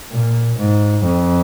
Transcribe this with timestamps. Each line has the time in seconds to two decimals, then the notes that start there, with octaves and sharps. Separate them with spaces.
0.12 A#2
0.58 G#2
1.05 F2